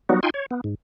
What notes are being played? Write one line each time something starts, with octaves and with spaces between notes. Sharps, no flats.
F#3 G3 B3 D#4 F#4
D#4 F4 G5 G#5 C6
C#5
B3
G#2